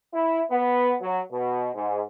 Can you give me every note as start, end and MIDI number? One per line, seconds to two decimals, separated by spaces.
0.13 0.41 64
0.51 0.94 59
1.01 1.20 54
1.31 1.68 47
1.75 2.00 44